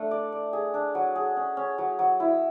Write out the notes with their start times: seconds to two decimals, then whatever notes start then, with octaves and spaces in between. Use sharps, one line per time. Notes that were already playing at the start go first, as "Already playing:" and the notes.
Already playing: A3 D4
0.11 D5
0.32 D5
0.53 G#4
0.74 D4
0.95 F#3
1.15 G#4
1.37 C#4
1.57 C#4
1.78 F#3
1.99 F#3
2.20 E4